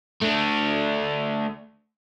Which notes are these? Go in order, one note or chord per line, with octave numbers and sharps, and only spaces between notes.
A3 D4